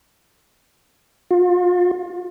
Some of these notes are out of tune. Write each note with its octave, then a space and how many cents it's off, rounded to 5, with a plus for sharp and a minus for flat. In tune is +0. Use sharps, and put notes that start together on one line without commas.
F4 +35